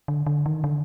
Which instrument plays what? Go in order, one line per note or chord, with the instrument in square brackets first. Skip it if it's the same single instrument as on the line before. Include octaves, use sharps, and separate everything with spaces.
[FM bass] D3
D3
D#3
D3